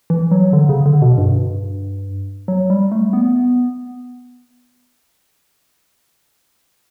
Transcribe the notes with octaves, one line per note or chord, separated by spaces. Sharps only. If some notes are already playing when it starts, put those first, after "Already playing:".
E3
F#3
D3
C#3
D3
B2
G2
F#3
G3
A3
B3